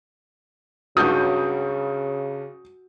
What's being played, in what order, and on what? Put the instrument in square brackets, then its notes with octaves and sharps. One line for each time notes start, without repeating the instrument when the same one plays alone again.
[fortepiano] C#2 G2 F#3 [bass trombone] C#3 [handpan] F#4 [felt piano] D#6 G6